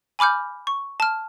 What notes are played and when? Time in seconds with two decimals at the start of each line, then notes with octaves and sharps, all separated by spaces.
0.19 G#5 B5 D6 F6 G6
0.67 C#6
1.00 A5 F6